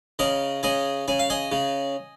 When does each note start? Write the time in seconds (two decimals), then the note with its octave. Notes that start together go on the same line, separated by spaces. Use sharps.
0.19 C#3 A#4 D#5
0.63 C#3 D#5 G#5
1.08 C#3 G#5
1.19 F5
1.30 D#5 G#5
1.52 C#3